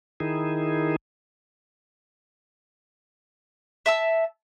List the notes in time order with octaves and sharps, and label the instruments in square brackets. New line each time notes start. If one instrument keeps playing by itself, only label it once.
[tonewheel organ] D#3 D#4 E4 G#4
[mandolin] E5 A5 E6